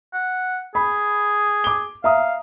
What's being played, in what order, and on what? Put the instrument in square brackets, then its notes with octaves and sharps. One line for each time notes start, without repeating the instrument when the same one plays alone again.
[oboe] F#5
[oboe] G#4 [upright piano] B5
[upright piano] D6 G7
[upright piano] E5 A#5 D#6 [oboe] F5